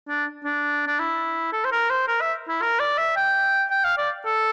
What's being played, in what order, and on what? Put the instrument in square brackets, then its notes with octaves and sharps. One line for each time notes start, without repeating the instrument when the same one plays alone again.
[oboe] D4
D4
D4
E4
A4
C5
A#4
C5
A#4
E5
E4
A#4
D5
E5
G5
G5
F5
D5
A4